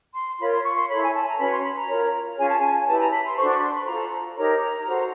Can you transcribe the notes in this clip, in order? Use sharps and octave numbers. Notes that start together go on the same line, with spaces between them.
C6
F4 A#4 C#5 B5
C6
C#6
C6
E4 A4 C#5 B5
G#5
A5
A#5
C#4 F#4 B4 B5
C6
B5
A#5
F4 A#4 C#5
C#4 F4 G#4 C#5 G#5
A5
G#5
E4 G4 B4 A5
A#5
B5
C6
D4 F#4 A4 C5 C#6
C#6
B5
C6
B5
F4 A4 C5 A#5
D#4 G4 A#4 C#5 A#5
F#4 A4 C5